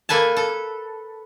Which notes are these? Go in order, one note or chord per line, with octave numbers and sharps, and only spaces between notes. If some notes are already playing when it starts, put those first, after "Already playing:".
A#3 A4 B4 G#5 A5
A4